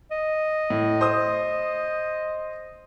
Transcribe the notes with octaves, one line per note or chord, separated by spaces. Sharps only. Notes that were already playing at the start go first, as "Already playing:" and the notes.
D#5
A2
C5 D#6